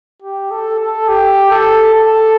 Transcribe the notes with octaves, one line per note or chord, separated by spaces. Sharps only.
G4
A4
A4
G4
A4
A4